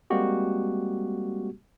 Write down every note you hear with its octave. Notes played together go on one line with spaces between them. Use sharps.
G3 G#3 A#3 C4 F#4 G4